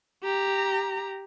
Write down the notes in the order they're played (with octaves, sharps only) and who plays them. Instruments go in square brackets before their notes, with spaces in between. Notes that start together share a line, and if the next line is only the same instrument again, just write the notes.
[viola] G4 A#5